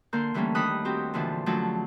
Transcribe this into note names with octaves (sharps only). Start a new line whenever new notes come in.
D3 A#3 A#4 C6 G6
D3 E3 G3 A3 A#3 C#4
D#2 D4 D#4 B5 D#6 F#6
C4 F#4 G4 C5
A#2 D3 E3 F3
D3 F3 F#3 A3 C#4